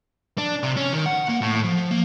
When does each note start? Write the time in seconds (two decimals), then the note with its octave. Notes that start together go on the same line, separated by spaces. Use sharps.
0.38 D4
0.63 C3
0.76 C#4
0.93 D#3
1.06 F#5
1.29 A#3
1.42 A2
1.64 F3
1.91 A#3